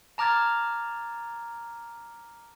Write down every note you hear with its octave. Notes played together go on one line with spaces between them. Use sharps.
A5 A#5 D6 F6 G#6 A6